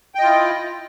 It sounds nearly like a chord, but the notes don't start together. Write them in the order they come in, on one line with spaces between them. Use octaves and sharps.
G5 D#5 F4 E4